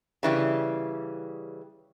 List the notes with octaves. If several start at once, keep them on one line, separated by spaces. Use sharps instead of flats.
C#3 E3 G3